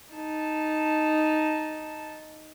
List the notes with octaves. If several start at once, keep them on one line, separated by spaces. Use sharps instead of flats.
D#4 A5